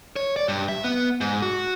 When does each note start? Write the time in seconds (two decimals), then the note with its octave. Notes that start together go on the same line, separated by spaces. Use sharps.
0.16 C#5
0.36 D5
0.48 G2
0.69 E5
0.84 B3
1.21 G#2
1.42 F#4